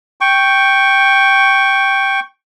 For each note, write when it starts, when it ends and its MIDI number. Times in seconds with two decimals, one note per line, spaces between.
0.21 2.20 79
0.21 2.20 85